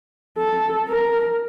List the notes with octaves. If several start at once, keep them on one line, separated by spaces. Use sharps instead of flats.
A4
A#4